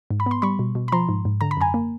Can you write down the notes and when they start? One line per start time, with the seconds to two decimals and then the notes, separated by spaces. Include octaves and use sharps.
0.11 G#2
0.20 B5
0.26 B3 C6
0.42 G3 B5 C#6
0.59 B2
0.75 B2
0.88 B5
0.92 F3 A#5 C6
1.09 G#2
1.25 G#2
1.41 D3 A#5
1.51 B5
1.57 F#2 G#5 A#5
1.74 A#3